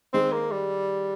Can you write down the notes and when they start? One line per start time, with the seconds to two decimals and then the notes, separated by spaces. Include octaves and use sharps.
0.14 D#3 G#3 C4 D#4
0.33 A#3
0.52 G3